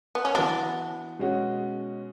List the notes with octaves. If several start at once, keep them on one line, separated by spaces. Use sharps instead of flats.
B3
C#4
E3 B3 D4 F#4
B2 G#3 C#4 F#4